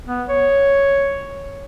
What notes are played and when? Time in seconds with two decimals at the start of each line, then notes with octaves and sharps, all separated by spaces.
0.07 B3
0.28 C#5